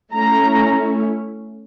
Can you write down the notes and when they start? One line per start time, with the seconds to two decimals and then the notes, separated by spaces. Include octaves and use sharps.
0.12 A3 C#4 E4 A#5